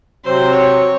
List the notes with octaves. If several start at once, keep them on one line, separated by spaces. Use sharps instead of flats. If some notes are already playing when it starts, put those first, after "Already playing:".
C3 F#3 C4 C5
C#5